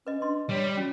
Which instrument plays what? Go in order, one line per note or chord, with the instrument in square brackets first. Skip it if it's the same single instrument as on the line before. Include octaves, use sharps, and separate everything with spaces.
[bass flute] C#4 [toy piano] B4 D#5
[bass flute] D4 [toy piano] D#5 C6
[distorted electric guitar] G3 [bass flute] C#5
[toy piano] C#4 [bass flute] F#4